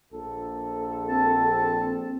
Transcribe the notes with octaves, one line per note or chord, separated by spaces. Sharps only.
A#1 A4
C4 A5